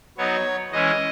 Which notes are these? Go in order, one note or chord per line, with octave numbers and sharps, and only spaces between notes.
F#3 B3 D#4 C#5
E3 G#3 C#4 E4 D#5